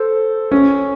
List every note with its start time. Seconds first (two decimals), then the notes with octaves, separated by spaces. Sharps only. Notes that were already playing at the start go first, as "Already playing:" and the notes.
Already playing: A4 C5
0.52 C#4